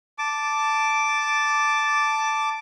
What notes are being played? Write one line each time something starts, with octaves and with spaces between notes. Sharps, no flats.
A5 D6